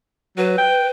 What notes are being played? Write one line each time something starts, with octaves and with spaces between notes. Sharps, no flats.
F#3 B4
G5